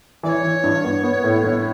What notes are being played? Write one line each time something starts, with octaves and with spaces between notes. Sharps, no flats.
E3 D5
C#5
E3
G2
B3
B3
A2
G1